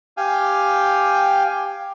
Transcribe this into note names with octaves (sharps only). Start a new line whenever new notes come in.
G4 F5 G5 G#5